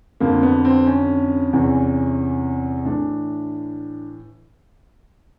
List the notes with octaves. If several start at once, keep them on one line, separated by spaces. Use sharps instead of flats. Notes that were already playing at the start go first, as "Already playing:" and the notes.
F2 D3 A#3
B3
C4
C#4
E2 C3 E3 C#4
A2 E3 D4